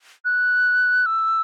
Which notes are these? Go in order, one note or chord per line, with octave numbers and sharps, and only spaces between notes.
F#6
E6